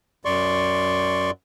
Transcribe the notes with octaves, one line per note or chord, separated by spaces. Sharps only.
F#2 D5 C6 C#6